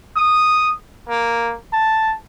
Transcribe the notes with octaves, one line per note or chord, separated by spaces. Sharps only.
D#6
A#3
A5